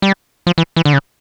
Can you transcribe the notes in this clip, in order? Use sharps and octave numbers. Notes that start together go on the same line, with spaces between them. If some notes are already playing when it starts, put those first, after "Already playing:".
G3
F3
E3
E3
D3
C#3